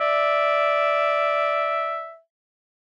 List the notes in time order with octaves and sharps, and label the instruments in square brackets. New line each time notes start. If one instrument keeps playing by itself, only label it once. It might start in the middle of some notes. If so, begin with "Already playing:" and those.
[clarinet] D5 [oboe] E5